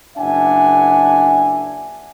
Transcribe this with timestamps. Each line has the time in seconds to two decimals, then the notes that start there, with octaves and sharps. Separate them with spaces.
0.17 F#1 D4 E5 F#5 G#5